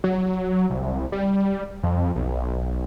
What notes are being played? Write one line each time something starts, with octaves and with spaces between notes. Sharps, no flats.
F#3
C2
G3
F2
B1